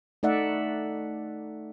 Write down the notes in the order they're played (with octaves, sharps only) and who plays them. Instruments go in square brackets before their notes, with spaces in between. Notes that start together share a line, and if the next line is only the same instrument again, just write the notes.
[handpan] A3 D#4 D5 E5 F#5